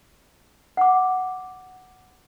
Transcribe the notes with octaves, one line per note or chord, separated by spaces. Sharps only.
F#5 D6